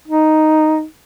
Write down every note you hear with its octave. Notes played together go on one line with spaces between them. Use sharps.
D#4